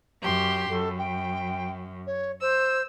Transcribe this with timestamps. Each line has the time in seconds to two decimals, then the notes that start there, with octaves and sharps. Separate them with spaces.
0.21 F#2 G4 C6
0.69 F#2 A4
0.98 G5
2.06 C#5
2.41 C5 E6